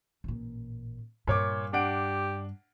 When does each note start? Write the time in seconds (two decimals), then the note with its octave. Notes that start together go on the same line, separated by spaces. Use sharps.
0.24 A1 A#2
1.27 G2 A#2 C#5 D6
1.73 D4 G4 F#5 D7